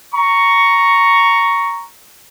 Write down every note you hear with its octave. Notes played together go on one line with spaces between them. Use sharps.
A#5 C#6